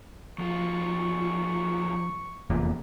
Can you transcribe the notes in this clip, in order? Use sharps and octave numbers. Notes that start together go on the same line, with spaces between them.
B1 F3 F4 C#6
F1 E2 A#2